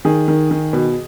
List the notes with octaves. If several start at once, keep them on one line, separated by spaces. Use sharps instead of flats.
D#3 G#4
D#3
D#3
B2